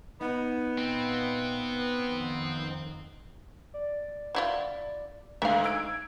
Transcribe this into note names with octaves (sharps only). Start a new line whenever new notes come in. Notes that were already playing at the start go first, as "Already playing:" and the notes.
B3 D#4
A#2 C4
F2 D#3
D5
F#3 E4 F4
D2 G#2 D4 E5 F5
E6 G#6 D7